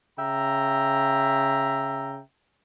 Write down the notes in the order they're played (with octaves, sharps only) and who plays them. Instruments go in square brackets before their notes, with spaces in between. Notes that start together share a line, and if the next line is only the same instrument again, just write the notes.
[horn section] C#3 E5 G5 A#5